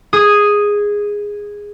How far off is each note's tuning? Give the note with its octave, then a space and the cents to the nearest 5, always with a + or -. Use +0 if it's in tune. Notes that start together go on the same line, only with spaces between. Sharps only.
G#4 -10 D#6 +0